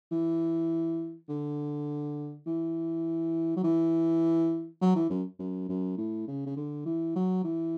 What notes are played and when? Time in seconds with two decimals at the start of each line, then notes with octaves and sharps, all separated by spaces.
0.11 E3
1.29 D3
2.46 E3
3.56 F#3
3.64 E3
4.81 F#3
4.96 E3
5.09 F#2
5.39 F#2
5.69 F#2
5.97 A2
6.27 C#3
6.46 C#3
6.56 D3
6.85 E3
7.15 F#3
7.44 E3